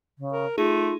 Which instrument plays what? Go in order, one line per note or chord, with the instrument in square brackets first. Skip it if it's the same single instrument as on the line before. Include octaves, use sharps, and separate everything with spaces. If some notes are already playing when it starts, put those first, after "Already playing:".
[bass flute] C#3
[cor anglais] A#4
[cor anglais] A3 [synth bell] D#4 G#4 D#7 [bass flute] F4